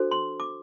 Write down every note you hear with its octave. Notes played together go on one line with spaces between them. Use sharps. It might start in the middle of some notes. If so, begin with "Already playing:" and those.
Already playing: D4 F#4 A4 C5
C6
D6